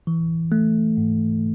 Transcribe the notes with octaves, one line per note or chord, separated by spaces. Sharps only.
E3
A3
G#2